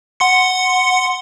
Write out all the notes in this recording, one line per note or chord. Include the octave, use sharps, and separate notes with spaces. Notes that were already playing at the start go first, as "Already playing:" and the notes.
F#5 C6 C#7